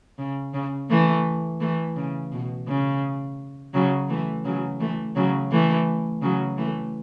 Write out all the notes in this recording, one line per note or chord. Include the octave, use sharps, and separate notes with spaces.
C#3
C#3
E3 A3
E3 A3
C#3
B2
C#3
C#3 F#3
E3 A3
C#3 F#3
E3 A3
C#3 F#3
E3 A3
C#3 F#3
E3 A3